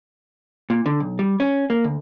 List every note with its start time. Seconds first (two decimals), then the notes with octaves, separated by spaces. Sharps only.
0.70 A#2
0.86 D3
1.00 B1
1.19 G3
1.40 C#4
1.70 A#3
1.84 D2